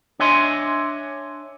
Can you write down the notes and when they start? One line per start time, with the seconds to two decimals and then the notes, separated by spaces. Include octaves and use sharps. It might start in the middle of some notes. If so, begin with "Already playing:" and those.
0.19 D4 C#5 D#5 E5 G#5 C6